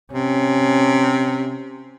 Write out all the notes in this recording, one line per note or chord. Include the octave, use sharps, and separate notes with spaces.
C3 C#4